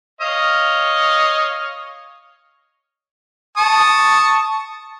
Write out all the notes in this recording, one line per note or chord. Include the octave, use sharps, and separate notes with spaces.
C#5 D#5 F5
A5 C#6 D#6